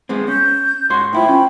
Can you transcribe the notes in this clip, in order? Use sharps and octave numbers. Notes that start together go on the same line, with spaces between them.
G#3 B3 C4
C#4 G6
G#2 F#4 C#5 C6
A2 E4 F4 C5 G5 B5
C#4